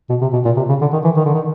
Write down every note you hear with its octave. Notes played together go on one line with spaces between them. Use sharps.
B2
C3
B2
A#2
C3
C#3
D3
D#3
E3
D#3
D3
D#3